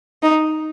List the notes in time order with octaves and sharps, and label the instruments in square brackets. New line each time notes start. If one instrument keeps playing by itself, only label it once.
[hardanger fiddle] D#4